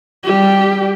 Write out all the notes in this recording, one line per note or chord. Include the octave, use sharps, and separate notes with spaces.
G3 G4